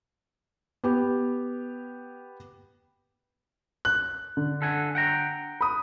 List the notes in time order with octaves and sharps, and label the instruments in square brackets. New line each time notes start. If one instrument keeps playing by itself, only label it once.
[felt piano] B3 G4
[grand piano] F#6
D3
[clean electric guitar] A4 F#5 G#5
F#5 G5 A#5
[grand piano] B5 D#6